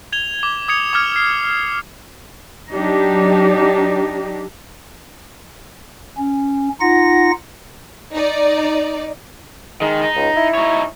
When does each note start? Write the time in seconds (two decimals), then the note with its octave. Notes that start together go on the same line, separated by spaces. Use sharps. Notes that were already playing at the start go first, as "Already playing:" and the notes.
0.13 G#6 F7 G7
0.43 D6
0.68 D#6 G#6 C#7 F7
0.93 D6 D#6 F6 G#6
1.16 C7
2.71 F#3 D4 D#4 G4
6.17 C#4
6.81 D#4 F4 F#5 A#6
8.13 D#4 D5
9.81 D#3 G#3
10.02 D#4
10.16 C#2
10.37 E4
10.54 D#4 C#5